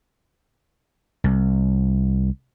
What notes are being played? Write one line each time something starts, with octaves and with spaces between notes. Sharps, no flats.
C2